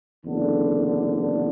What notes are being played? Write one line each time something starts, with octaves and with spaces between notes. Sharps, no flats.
F#1 E2 D3